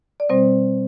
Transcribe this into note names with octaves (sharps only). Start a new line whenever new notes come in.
D5
B2 G3 C4 C5